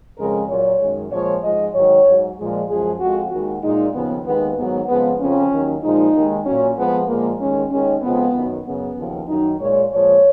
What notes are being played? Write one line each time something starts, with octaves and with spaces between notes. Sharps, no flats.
F2 C#3 G#3 A#4
A#2 F#3 C#5
F#2 D#3 G#3
A#2 F3 G#3 C#5
G#2 F3 G#3 D#5
G#2 D#3 F#3 C#5
G#2 F#3
A#2 F3 G#3
F#2 F3 G#3 G#4
F2 F3 G#3 F#4
D#2 D#3 G#3 F#4
A#2 G#3 D#4
D#2 C#3 F3 B3
D#2 D#3 G#3 B3
G#2 D#3 F#3 B3
F2 C#3 F3 G#3 B3
F2 C#3 F3 C#4
D#2 D#3 F#3
A#2 F3 G#3 D#4
D#2 D#3 G#3
A#2 F#3 C#4
F2 F3 G#3 B3
A#2 F3 G#3 A#3
D#2 D#3 G#3 C#4
D#2 D#3 G#3 C#4
F2 C#3 F3 G#3 B3
F#2 D#3 F#3
F#2 C#3 F#3 B3
D#2 C#3 F3
F#2 D#3 F#3 D#4
A#2 G#3 C#5
A#2 F3 G#3 C#5